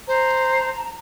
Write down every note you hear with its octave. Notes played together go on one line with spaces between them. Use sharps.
C5 A5 A#5